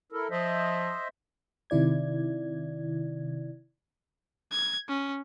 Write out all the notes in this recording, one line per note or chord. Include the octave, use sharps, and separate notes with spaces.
E4 A4 A#4
F3 C5 D#5 E5
C3 D#3 E4 D5 G#6
G#6
C#4